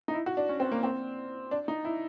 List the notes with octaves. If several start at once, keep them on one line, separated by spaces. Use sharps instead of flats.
D#4
E4
F#4
D4
C#4
C4
A#3
C4
D4
D#4
E4